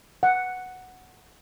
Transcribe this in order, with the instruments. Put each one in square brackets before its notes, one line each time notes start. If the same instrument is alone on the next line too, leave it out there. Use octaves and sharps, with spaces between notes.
[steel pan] F#5